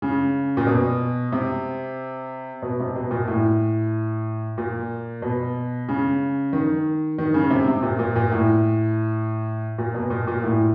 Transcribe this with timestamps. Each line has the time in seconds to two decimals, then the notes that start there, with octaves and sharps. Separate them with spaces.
0.02 C#3
0.57 A#2
0.67 B2
1.32 C3
2.62 B2
2.79 C3
2.96 B2
3.11 A#2
3.28 A2
4.58 A#2
5.22 B2
5.89 C#3
6.53 D#3
7.18 D#3
7.34 C#3
7.50 C3
7.67 C3
7.83 A#2
7.99 A#2
8.16 A#2
8.32 A2
9.78 A#2
9.94 B2
10.10 A#2
10.27 A#2
10.44 A2